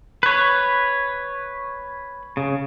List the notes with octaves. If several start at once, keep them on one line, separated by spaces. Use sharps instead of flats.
B4 C#5
C#3